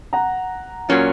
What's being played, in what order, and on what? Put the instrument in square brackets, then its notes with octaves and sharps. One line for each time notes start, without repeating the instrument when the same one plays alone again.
[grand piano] F#5 A#5
[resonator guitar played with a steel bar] A#2 F#3 A#3 C#4 F4